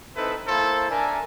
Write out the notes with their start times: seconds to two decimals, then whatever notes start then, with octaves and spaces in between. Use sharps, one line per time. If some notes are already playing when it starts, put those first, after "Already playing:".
0.16 C4 D#4 E4 A4 B4
0.48 A#3 E4 A4 C5
0.90 D4 A#4 E5 G#5